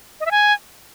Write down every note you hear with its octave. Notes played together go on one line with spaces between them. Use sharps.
D#5
E5
G#5